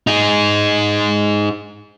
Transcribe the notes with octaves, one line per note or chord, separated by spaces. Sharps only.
D#4 G#4